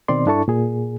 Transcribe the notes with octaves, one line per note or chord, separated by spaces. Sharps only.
B2 D#3 C4 D5 C6
G2 D4 E4 A4 A5 C#6
A#2 G#4